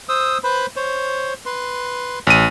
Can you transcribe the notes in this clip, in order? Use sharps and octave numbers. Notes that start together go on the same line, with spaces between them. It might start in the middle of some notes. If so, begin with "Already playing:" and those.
C5 D#6 E6
B4 C5 B5
C5 C#5
B4 C6
A1 D#7